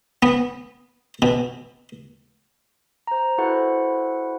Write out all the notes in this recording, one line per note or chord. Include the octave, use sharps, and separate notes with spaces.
B3
B2
C5 A#5
E4 F#4 A4 B4 C5 F#5